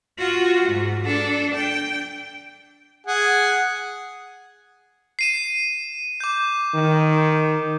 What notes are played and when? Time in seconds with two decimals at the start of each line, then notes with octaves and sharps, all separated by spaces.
0.18 F4 F#4
0.68 G#2
1.05 D4 A4
1.54 G5
3.07 G#4 F#5 G#5
5.19 C7 D#7 E7
6.20 D6 G6
6.75 D#3